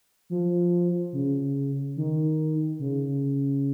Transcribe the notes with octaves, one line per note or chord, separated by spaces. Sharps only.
F3
C#3
D#3
C#3